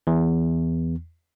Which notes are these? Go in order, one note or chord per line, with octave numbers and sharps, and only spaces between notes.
E2